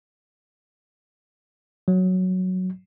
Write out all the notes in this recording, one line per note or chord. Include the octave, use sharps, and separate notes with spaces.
F#3